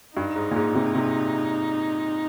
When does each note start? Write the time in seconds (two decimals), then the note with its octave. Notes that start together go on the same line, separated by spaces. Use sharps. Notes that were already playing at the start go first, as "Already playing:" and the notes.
0.16 G2 D#4
0.36 G#2
0.51 A#2
0.56 G#2
0.75 C3
0.95 C3